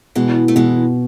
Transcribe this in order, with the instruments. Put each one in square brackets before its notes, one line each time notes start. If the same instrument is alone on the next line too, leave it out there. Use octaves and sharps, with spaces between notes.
[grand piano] B2 [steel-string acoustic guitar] E3 G#3
[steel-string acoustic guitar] A3
[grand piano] B2 [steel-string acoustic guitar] E3 G#3